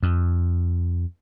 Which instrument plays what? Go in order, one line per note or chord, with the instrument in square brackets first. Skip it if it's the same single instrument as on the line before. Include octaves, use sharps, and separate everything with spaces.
[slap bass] F2